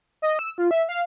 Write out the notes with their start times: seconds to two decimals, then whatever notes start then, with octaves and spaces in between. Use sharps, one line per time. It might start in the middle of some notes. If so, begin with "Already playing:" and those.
0.22 D#5
0.39 E6
0.58 F4
0.71 E5
0.89 F5